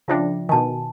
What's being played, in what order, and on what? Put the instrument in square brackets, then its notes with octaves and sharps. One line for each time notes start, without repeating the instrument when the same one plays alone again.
[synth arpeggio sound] C#3 F3 D4 [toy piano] F4 E5 G5
[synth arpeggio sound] B2 D#3 [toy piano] G#5 A5